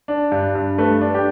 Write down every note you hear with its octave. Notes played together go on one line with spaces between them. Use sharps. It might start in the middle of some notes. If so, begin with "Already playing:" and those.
D4
G2
G2
A3 B4
D4
G4